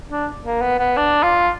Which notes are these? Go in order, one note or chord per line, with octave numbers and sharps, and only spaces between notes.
D4
A#3
B3
B3
D4
F4